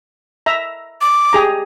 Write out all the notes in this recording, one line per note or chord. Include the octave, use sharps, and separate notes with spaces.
E5 A#5
D6
G4 G#4 A#5